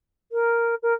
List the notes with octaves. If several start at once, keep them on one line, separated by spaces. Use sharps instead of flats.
A#4
A#4